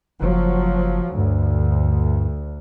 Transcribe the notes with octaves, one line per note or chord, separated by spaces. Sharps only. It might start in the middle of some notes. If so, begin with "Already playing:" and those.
F#1 F3 F#3
D2 G2